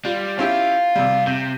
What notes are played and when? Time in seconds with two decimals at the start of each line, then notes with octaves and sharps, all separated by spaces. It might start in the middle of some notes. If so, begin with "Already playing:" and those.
0.05 G3 F4
0.39 C#4 E4 F4 G4
0.96 C3 G3
1.27 C3 G6